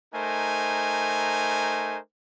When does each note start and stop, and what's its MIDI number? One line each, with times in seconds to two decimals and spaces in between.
0.14 1.99 57
0.14 1.99 63
0.14 1.99 70
0.14 1.99 72
0.14 1.99 80